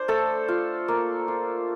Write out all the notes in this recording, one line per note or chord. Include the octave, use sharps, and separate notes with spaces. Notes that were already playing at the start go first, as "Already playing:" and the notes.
Already playing: D4 C5 D5
A3 A4
F4
A#3
F4